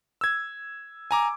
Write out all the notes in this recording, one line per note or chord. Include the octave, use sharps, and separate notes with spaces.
E6 G#6
G#5 A#5 D6